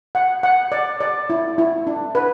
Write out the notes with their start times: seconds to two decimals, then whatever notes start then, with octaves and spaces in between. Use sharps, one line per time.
0.15 F#5
0.43 F#5
0.72 D5
1.00 D5
1.30 E4
1.58 E4
1.87 D4
2.15 B4